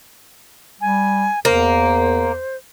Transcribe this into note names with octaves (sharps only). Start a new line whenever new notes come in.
G3 G#5
E2 A#3 C5